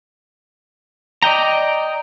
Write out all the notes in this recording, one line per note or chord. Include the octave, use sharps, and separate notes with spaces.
D5 D#5 G5 A#5